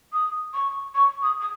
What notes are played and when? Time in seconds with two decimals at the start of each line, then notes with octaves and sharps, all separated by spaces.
0.12 D#6
0.53 C#6
0.94 C#6
1.22 D#6
1.40 D#6